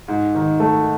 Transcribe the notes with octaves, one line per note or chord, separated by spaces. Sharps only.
G#2
D#3
A3